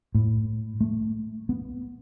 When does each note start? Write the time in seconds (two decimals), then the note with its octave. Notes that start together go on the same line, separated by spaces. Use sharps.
0.15 A2
0.81 A3
1.49 B3